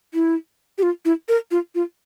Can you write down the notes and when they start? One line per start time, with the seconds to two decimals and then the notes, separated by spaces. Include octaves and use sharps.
0.14 E4
0.78 G4
0.83 F4
1.05 E4
1.29 A#4
1.51 F4
1.75 F4